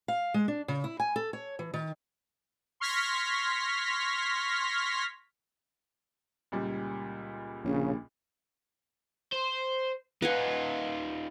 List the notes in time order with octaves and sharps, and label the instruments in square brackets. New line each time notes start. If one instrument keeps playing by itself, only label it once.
[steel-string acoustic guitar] F5
G#3
D4
C#3
E4
G#5
A4
C#5
E3
D#3
[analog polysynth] C6 C#6 F6 G#6 A#6 B6
[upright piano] C#2 A#2 G3
[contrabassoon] A#1 [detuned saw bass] C#3
[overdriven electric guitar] C5
[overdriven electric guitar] D#4 F4 [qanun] B4 F#5 G#5